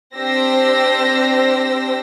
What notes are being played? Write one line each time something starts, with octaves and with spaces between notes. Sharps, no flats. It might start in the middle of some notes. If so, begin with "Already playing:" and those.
C4 D4 G4 C5 E6 A#6